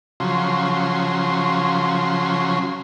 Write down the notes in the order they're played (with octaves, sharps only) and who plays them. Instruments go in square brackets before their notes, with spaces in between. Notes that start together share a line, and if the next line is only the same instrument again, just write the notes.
[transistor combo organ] C#3 F3 F#3 C6